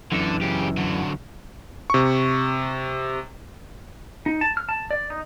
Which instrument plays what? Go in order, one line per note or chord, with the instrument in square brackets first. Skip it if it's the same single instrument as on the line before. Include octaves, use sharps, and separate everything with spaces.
[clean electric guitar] F#2 E3 [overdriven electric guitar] D3 A4
[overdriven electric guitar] C#3 G4
D3 F#3
[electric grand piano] C3 C#6
[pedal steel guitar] D#4
A5
F6
A5
D5
D#4